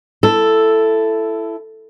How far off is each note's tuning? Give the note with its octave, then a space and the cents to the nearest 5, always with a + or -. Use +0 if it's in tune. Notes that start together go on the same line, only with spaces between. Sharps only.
E4 +15 A4 +0